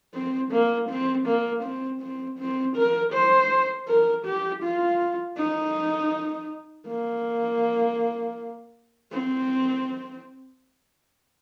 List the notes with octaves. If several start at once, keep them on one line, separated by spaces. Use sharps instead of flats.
C4
A#3
C4
A#3
C4
C4
C4
A#4
C5
A#4
G4
F4
D#4
A#3
C4